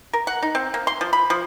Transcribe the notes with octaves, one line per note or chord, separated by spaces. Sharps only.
A#4
F#5
D#4
C4
A#3
C6
F3
B5
F3